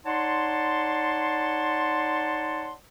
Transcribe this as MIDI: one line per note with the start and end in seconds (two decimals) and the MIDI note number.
0.05 2.73 63
0.05 2.73 73
0.05 2.73 74
0.05 2.73 78
0.05 2.73 81
0.05 2.73 84